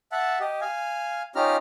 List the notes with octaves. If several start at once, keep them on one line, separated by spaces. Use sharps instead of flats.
E5 F#5 A5
G4 D#5
F5 G#5
C#4 D#4 F4 G4 A#5 F6